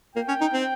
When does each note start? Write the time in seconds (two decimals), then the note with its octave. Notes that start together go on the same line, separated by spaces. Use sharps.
0.15 A#3 G5
0.28 C#4
0.41 D#4
0.53 C4